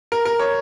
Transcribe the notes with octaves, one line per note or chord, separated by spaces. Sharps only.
A#4
A#4
C#5